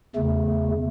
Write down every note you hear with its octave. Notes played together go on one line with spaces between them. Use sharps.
E2 C#3 A3